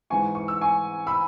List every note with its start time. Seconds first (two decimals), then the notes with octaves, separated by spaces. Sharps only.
0.10 G#2 E3 G#5 C#6
0.35 C#6
0.48 E6
0.61 G#5 C#6
1.07 B5 E6